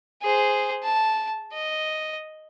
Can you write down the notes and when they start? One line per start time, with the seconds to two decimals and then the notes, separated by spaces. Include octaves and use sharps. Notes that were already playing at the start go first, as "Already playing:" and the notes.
0.22 G#4 C5
0.83 A5
1.53 D#5